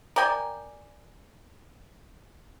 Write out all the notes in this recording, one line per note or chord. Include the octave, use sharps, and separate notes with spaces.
A#4 D5 G5 G#5